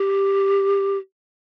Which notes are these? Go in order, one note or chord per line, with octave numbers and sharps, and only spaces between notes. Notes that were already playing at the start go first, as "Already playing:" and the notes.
Already playing: G4